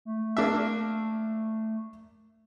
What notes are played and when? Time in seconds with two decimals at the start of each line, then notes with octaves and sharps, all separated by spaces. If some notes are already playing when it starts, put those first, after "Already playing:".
0.05 A3
0.37 A#3 D4 E5